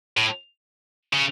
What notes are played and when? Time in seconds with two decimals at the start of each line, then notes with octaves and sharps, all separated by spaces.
0.17 A2
1.14 C#3